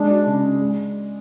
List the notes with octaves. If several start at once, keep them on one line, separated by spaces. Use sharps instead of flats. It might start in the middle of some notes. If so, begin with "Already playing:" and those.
Already playing: G#3 D4
F#4
C#3
D4
G#3